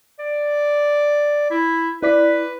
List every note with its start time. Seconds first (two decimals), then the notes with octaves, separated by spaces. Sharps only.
0.19 D5
1.51 E4
2.02 E4 B4 D5 B6